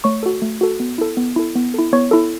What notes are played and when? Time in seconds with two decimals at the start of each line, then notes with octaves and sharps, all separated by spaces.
0.04 A3 C#5 C#6
0.23 F#4 A4
0.42 A3
0.61 F#4 A4
0.80 B3
0.98 E4 A4
1.17 B3
1.36 E4 A4
1.55 B3
1.74 E4 A4
1.93 B3 C#5 C#6
2.11 E4 A4